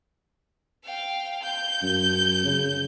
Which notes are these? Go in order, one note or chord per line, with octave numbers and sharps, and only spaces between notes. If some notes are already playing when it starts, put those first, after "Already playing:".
F5 G5
G6
F#2
C#3